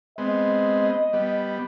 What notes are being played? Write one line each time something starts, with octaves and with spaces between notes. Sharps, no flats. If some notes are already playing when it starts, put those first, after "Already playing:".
G#3 B3 C4 D#5
G3 B3